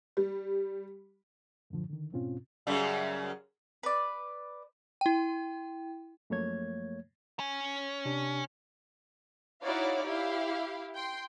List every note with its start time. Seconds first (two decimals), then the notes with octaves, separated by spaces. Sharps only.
0.17 G3
1.70 F#2 A2 D3 F3
1.90 D3 D#3
2.12 F2 G#2 B2 C4 C#4 F4
2.67 F#2 C#3 G3
3.83 B4 D5
5.01 E4 G5
6.30 F#2 F3 A3 A#3 C#5 G#6
7.40 C#4
8.05 C3 D4 G4
9.63 D#4 E4 F#4 C#5 D5 F5
10.06 E4 G4 F5
10.94 G5 C6